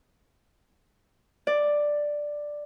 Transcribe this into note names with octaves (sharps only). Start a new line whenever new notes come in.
D5